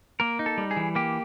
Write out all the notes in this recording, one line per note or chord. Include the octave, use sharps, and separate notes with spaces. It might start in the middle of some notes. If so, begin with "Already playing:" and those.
A#3 A#4
D#4
A4
G3
G#4
E3
A#3 G4